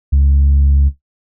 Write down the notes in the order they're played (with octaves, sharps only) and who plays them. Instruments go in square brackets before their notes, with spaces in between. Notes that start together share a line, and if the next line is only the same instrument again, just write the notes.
[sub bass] C#2